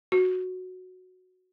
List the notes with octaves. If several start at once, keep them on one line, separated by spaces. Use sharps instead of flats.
F#4